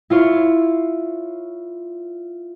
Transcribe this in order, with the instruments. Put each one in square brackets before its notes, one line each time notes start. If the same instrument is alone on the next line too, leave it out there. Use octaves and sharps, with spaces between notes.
[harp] E4 F4 C#5